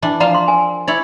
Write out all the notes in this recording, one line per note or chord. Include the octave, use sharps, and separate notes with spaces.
E3 D4 D5
F3 F4 D5 F5 A#5
C6
A#4 G#5
E4 C#5 D5